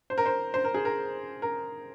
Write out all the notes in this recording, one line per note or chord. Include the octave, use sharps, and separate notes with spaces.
C5
A#4
C5
C5
A#4
G#4
A#4
A#4